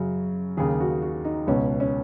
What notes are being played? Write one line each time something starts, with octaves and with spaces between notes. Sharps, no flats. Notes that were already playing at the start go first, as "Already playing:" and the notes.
Already playing: F#2 C#3 F#4
D#2 C#3 G#4
F#4
F#4
D#4
C#2 B2 C#4
C#4